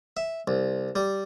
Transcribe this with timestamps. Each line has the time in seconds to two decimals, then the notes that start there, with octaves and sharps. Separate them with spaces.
0.17 E5
0.48 C2
0.96 G3